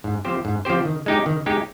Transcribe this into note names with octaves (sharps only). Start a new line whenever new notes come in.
G#2
F3 C4 G4 C5
G#2
F3 C4 G4 C5
D#3
G#3 D#4 G4
D#3
G#3 D#4 G4